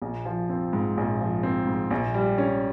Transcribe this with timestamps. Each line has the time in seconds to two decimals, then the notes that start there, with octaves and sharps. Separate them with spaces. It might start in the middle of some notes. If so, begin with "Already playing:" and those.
0.02 A#1
0.25 F3
0.49 C4
0.73 G#2
0.97 A#1
1.21 F3
1.43 C4
1.67 G#2
1.91 A#1
2.14 G3
2.38 C#4